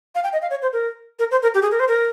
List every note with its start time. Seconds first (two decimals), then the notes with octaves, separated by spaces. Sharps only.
0.15 F5
0.24 G5
0.33 D#5
0.42 F5
0.50 C#5
0.62 C5
0.73 A#4
1.19 A#4
1.31 C5
1.43 A#4
1.54 G4
1.62 G#4
1.71 A#4
1.80 C5
1.88 A#4